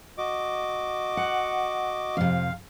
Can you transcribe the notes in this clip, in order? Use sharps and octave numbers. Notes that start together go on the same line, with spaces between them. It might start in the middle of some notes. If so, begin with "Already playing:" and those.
F#4 D#5 D6
F#5
F2 C3 F5